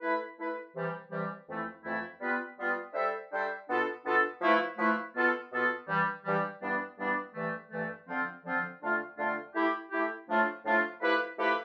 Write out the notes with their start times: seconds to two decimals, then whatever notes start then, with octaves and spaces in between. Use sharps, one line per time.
0.01 A3 E4 B4
0.37 A3 E4 B4
0.74 C3 E3 G3
1.11 C3 E3 G3
1.47 F2 E3 A3 E4
1.84 F2 E3 A3 E4
2.21 G3 B3 F4 B4
2.57 G3 B3 F4 B4
2.94 G3 D4 A4 C5 E5
3.31 G3 D4 A4 C5 E5
3.67 B2 B3 D4 F4 A4
4.04 B2 B3 D4 F4 A4
4.41 F3 A3 E4 B4
4.77 F3 A3 E4 B4
5.14 B2 B3 F4 A4
5.51 B2 B3 F4 A4
5.87 G2 E3 G3
6.24 G2 E3 G3
6.61 G2 E3 G3 B3 D4
6.97 G2 E3 G3 B3 D4
7.34 G2 E3 A3
7.71 G2 E3 A3
8.08 D3 F3 C4 F4
8.44 D3 F3 C4 F4
8.81 F2 D3 A3 D4 F4
9.17 F2 D3 A3 D4 F4
9.54 A3 E4 G4
9.91 A3 E4 G4
10.28 A2 F3 A3 D4 F4
10.64 A2 F3 A3 D4 F4
11.01 F3 A3 E4 G4 B4
11.37 F3 A3 E4 G4 B4